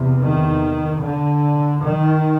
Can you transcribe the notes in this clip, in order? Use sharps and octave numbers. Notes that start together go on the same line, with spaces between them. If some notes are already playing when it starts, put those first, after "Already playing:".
Already playing: E2 C3
D#3
D3
D#3